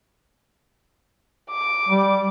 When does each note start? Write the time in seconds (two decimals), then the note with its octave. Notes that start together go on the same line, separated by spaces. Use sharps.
1.51 D6
1.89 G3